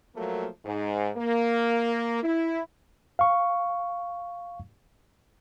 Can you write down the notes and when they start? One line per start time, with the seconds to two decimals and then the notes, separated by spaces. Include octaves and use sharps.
0.16 F3 F#3 A3 A#3
0.66 G#2
1.17 A#3
2.23 E4
3.19 F5 C#6